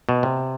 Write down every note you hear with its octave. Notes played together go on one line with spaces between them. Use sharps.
B2
C3